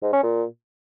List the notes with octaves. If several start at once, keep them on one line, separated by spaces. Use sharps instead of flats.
G#2
C#4
A#2